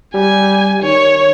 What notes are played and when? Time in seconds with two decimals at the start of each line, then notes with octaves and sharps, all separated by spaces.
0.14 G3 G#5
0.82 D#3 C#5